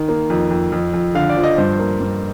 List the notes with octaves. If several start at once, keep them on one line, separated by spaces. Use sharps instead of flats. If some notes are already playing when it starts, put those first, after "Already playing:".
Already playing: D#3
A#3
F2
F2
F2
F2
D3 F5
D5
F3
D#5
G2 C5
A#3
G2